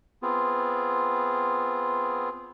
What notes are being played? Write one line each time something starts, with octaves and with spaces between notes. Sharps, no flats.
B3 C4 F4 G#4